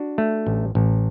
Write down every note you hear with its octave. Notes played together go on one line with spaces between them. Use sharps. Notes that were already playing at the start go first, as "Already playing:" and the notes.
Already playing: D4 F#4
A3
A1
A1